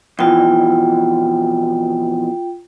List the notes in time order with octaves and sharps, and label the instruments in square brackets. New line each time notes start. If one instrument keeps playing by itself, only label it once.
[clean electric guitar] F2 B2 E3 [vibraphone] F4 G5